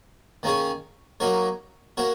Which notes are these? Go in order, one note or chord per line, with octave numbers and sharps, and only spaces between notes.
D#3 A#3 C#4 G#4 C#5
F#3 A#3 D#4 A#4 C#5
A#3 F#4 A#4 C#5